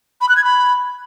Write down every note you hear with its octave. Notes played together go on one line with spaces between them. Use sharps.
B5
F#6
G#6
B5